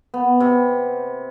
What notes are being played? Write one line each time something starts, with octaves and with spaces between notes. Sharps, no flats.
B3
C3